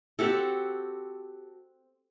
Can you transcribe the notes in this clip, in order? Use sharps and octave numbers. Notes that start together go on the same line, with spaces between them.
C4 F#4 G4 A4